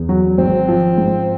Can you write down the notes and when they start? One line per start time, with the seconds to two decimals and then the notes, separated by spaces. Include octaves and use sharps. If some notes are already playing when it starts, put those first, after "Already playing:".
Already playing: E2
0.09 F#3
0.38 G#1 C4
0.68 F3
0.98 G#2